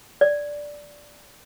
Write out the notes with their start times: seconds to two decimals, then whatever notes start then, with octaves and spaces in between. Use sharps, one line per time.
0.21 D5